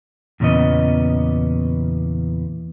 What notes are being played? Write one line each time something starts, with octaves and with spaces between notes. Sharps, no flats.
E2 A#2 C#3 B3 D#5